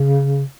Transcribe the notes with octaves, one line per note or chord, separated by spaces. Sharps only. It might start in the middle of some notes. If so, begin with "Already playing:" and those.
Already playing: C#3